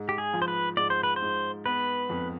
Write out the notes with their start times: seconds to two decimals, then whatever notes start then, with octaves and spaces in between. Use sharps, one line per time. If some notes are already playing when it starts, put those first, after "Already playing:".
Already playing: G#2
0.09 G4
0.18 G#4
0.33 F3
0.42 C5
0.48 B4
0.77 G#2 D5
0.90 C5
1.03 B4
1.16 C5
1.22 G#2
1.66 B3 B4
2.09 F2